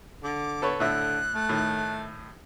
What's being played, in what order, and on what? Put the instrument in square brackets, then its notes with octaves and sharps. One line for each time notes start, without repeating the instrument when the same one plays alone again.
[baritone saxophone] D3 [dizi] D6
[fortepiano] A4 B4 C#5
[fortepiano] A2 E5 [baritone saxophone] D3 [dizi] F#6
[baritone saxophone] A3
[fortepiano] A2 D#3